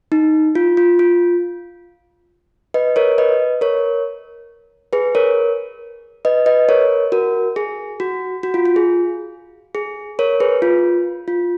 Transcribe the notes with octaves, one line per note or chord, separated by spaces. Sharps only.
D#4
F4
F4
F4
B4 D#5
A#4 C#5
B4 D#5
A#4 C#5
G#4 B4
A#4 C#5
B4 D#5
B4 D#5
A#4 C#5
F#4 A#4
G#4
F#4
F#4
F4
F4
G#4
G#4
A#4 C#5
G#4 B4
F4
F4